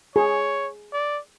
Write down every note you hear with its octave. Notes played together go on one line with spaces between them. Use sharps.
G#4 C#5
D5